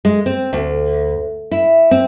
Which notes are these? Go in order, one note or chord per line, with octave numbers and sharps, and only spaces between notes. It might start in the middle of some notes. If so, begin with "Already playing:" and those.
G#3
C4
D2
E4
C4